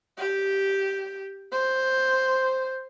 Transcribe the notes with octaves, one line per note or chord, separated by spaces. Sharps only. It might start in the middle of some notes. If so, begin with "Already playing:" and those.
G4
C5